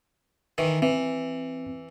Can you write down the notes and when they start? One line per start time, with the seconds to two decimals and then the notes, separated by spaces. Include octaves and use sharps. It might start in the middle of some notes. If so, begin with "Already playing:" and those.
0.58 D#3 E3
0.82 E3 C4